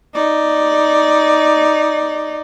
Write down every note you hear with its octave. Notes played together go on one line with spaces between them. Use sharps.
D#4 D5